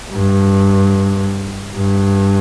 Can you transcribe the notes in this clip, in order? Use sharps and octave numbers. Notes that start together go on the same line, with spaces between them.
G2
G2